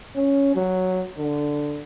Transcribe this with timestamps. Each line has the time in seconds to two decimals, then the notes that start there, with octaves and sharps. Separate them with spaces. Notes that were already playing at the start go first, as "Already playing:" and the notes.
0.16 C#4
0.55 F#3
1.18 D3